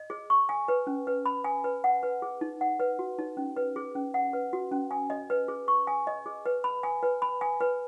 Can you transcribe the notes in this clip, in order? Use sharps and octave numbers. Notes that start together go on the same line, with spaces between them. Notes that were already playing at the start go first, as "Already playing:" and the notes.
Already playing: D#5
G#4
C#6
G#5
B4
C#4
B4
B5
G#5
B4
F#5
B4
G#4
D#4
F#5
B4
F#4
D#4
C#4
B4
G#4
C#4
F#5
B4
F#4
C#4
G#5
D#5
B4
G#4
C#6
G#5
D#5
G#4
B4
B5
G#5
B4
B5
G#5
B4